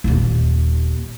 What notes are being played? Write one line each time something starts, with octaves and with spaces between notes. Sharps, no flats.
D#1 D#2